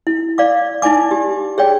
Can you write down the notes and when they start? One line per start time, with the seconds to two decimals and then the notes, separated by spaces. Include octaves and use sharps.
0.07 E4
0.38 D5 F5 D6
0.82 D#4 E4 D5 G#5 D6
1.11 G4
1.58 G#4 C#5 D5 G5